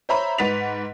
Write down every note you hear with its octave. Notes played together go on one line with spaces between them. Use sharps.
C5 C#5 E5 A#5 B5
G#2 B4 F#5 A6 B6 F7